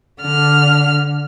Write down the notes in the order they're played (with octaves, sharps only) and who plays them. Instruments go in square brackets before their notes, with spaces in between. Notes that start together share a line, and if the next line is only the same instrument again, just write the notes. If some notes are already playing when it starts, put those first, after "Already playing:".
[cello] D3 [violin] F6